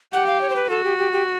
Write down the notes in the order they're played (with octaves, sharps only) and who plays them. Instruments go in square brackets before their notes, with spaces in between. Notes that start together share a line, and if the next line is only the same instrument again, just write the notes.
[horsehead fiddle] G4 [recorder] F#5
[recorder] F5
C#5
C5
B4
[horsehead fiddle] F#4 [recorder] A4
[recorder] G4
G4
G4